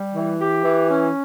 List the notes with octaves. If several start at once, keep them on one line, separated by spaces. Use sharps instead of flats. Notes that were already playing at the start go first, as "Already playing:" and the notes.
Already playing: G3
E3
G4
E3
C#4